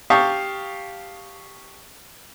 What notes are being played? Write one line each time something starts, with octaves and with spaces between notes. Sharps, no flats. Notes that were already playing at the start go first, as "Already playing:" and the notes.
G4 F5 A5 C#6 D#6